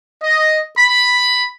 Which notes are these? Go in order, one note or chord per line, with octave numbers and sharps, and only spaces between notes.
D#5
B5